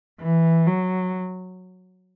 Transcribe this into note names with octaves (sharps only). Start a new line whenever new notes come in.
E3
F#3